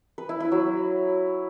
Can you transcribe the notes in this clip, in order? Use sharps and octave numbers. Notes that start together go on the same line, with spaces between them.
B4
E4
E4
F#3